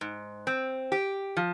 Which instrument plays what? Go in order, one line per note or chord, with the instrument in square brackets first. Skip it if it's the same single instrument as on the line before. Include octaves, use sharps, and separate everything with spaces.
[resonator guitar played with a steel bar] G#2
C4
G4
F3